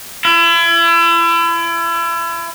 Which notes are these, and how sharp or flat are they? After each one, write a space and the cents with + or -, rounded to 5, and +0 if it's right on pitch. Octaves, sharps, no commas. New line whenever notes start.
E4 +35